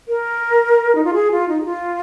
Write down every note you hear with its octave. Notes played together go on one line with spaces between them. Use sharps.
A#4
D#4
F4
G#4
F4
D#4
G#4
F4